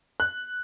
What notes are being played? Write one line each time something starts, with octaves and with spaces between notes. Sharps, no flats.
F#6